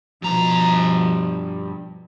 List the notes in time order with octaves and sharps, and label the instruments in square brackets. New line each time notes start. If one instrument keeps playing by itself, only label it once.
[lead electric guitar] G2 A#5 [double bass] B2 F3